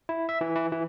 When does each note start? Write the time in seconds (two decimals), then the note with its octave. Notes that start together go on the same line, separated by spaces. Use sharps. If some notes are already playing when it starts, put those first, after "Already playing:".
0.09 E4
0.29 E5
0.41 E3
0.55 E3
0.72 E3